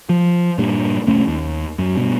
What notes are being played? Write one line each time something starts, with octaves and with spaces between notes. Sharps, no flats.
F3
G2 A#2
F1 C2 A3 C#4
D#2
F#2
G2 B2